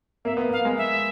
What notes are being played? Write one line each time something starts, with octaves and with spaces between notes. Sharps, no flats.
A#3 E5
B3
A#3 F5
G#3
E5